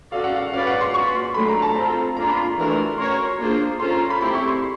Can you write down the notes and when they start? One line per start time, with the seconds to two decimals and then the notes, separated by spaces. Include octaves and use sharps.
0.12 C#4 F#4 A4 D5 F5
0.24 F#5
0.35 F5
0.53 C#4 F#4 B4 D5 F5
0.67 F#5
0.81 C6
0.94 A#3 C#4 F#4 B4 D5 C#6
1.15 C6
1.34 F#3 A3 D4 B5
1.48 A#5
1.62 A5
1.75 C4 F4 A4 A#5
2.17 A#3 D4 F4 A#5
2.29 B5
2.37 C6
2.57 E3 A3 D4 F#4 A#4
2.98 C#4 F#4 A#4 C#5 C6
3.39 A#3 D4 F4 G#4 C5
3.79 C#4 F4 A4 C5 C6
3.90 A#5
4.10 B5
4.21 A3 C4 E4 G4 B5
4.34 C#6
4.48 C6